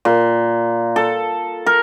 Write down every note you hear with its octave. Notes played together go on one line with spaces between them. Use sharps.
A#2
A4
A#4